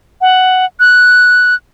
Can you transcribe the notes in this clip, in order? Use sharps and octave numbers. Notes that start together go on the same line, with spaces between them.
F#5
F#6